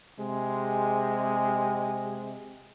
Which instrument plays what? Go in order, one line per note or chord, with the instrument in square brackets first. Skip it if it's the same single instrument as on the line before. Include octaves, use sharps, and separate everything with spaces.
[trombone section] C3 G#3